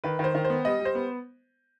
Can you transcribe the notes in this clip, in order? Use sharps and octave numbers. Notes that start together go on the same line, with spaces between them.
D#3 B4
D#3 C5
D#3
C5
B3
G3 D#5
G3
C5
B3